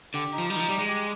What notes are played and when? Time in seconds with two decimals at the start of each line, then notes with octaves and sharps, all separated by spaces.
0.14 D3 G4
0.32 D#4
0.38 F3
0.50 G3 D#4
0.56 D#3
0.60 F3
0.69 G3 G4
0.79 G#3
0.88 G4